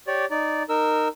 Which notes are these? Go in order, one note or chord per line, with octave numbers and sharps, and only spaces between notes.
G4 C#5 D5
D#4 D5
D#4 A#4 E6